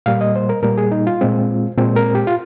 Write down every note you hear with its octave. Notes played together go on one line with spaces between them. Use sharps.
A#2 G3 A#3 F5
D#5
C5
A#4
A#2 G3 A#3 A#4
G#4
D#4
F4
A#2 G#3 C4
A#2 G#3 C4
A#4
G4
F4